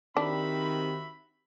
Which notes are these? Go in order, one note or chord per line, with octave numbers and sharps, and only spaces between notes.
D#3 C4 D4 F#4 G4 E5 B5